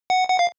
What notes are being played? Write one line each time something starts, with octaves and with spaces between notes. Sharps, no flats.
F#5
F#5
F5